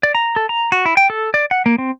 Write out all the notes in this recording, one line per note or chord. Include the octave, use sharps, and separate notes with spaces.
D5
A#5
A4
A#5
F#4
E4
G5
A4
D5
F#5
A#3
C4